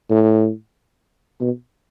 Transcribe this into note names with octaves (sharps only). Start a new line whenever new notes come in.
A2
B2